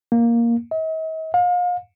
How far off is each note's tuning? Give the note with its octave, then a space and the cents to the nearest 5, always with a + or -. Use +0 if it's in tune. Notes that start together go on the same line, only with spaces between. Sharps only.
A#3 +5
D#5 +45
F5 +35